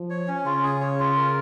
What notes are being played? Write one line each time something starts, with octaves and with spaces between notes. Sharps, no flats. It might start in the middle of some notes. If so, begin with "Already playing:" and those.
Already playing: F3
C#5
C#4
C#3 F4
G#4
C#5
F4
A#4